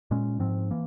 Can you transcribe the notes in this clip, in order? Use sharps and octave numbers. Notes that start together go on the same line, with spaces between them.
A#2 G#3 C#4
G#2 F3 C4
E3 A#3